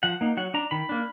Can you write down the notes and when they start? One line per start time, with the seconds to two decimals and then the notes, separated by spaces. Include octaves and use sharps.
0.03 F3 F#5
0.21 A#3 D#4
0.37 F#3 F#5
0.54 D4 A#5
0.71 D#3 B5
0.89 A#3 D4